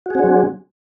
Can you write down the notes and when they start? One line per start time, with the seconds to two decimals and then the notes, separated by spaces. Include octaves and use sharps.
0.06 F#4
0.10 G#4
0.15 C4
0.19 D4
0.24 F#3